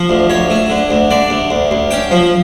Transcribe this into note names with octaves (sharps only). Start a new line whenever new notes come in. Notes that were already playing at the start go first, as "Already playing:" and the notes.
Already playing: F3
D2
D2 C#5
A3
D3
D2
D3 D5
D2
D2
D2
C#4 G5
F3